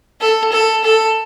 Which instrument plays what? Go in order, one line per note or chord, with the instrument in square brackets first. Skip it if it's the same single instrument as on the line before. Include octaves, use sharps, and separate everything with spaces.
[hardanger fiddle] A4
A4
A4